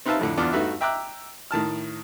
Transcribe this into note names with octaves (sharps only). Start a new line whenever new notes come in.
C4 D#4 B4 E5 F5 A5
F2 A2 D3
E2 B3 D4 F4 D6
G2 A3 D#4 F#4 B4 E5
E5 G5 A#5 D6 E6 F#6
A2 D#3 A5 F6